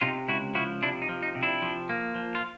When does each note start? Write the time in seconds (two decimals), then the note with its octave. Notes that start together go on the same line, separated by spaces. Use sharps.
0.01 C3 D#4 F4
0.28 C#2 E4 F#4
0.55 F3 E4 F#4
0.82 C3 D4 E4
1.02 D#4
1.09 F3
1.23 D#4
1.35 C3
1.43 D4 E4
1.62 F3
1.89 A#3
2.15 F3
2.35 F4